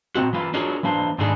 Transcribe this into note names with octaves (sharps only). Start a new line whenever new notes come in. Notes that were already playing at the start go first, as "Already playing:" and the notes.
A#2 E3 C4 F#4
E3 A#3 F4
D4 F4 F#4 G#4 A#4 C#5
E3 A#3 D4 C5
G#2 D#3 A3 D4 G#4